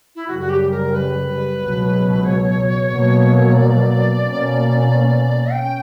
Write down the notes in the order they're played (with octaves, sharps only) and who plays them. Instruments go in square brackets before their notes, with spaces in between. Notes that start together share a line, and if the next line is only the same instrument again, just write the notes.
[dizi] E4
[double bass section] F#2 C#3 G3 [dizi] F#4
[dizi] F#4
G4
G4
A#4
B4
[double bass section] C#2 B2 F#3
[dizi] C#5
[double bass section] B2 F#3 A#3
[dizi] D5
[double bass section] B2 A#3 C#4
[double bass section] C#4 [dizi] G5